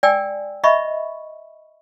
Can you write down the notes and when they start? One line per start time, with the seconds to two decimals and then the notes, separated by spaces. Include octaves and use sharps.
0.03 D5 G5 G#5 E6
0.64 D#5 E5 B5 C#6